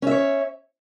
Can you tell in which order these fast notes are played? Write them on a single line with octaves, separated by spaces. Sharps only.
C#4 E5 C#5